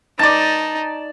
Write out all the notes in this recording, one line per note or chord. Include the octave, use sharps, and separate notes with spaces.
D#4 D5 A5